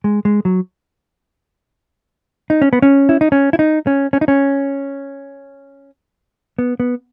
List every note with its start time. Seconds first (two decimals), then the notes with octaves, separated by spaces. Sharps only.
0.04 G#3
0.25 G#3
0.45 F#3
2.50 D#4
2.62 C#4
2.73 B3
2.82 C#4
3.09 E4
3.21 D#4
3.32 C#4
3.53 E4
3.59 D#4
3.87 C#4
4.13 C#4
4.21 D#4
4.28 C#4
6.59 B3
6.80 B3